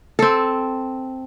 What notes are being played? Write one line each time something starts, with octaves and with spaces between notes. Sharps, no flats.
C4 A4